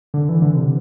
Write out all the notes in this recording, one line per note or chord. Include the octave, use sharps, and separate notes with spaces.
D3
E3
D3
C3